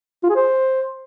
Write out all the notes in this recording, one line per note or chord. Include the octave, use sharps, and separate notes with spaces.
F4
G#4
C5